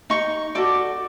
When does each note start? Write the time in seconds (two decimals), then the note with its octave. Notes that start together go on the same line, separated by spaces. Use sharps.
0.10 D#4 C#6
0.55 F#4 A4 D5 D6